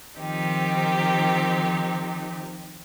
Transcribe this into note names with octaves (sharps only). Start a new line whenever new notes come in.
D#3 F3 C4 D#4 G4